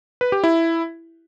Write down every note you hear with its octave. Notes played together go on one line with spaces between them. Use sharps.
B4
G4
E4